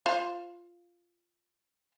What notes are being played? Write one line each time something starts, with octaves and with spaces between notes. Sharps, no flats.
F4 C5 F5